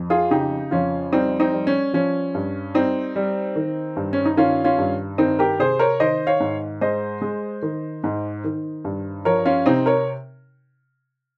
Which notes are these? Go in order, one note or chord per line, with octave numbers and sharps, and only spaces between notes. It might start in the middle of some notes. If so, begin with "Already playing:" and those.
Already playing: F2
F4 G#4
C#3 D#4 G4
F2 C#4 F4
G3 C4 D#4
C4 D#4
G3
C#4
F3 C#4
G2
G3 C4 D#4
G3
D#3
G2
C#4
D#4
D#3 C#4 F4
C#4 F4
G2
D#3 C4 D#4
G4 A#4
C3 G#4 C5
A#4 C#5
D#3 C5 D#5
C#5 F5
G#2
G#3 C5 D#5
G#3
D#3
G#2
D#3
G2
F3 A#4 C#5
C#4 F4
C3 C4 D#4
A#4 C#5